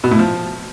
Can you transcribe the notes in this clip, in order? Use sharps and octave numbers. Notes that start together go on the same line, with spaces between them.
B2
A2
F3